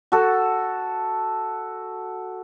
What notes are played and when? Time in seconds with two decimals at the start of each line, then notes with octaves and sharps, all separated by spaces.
0.12 F#4 A4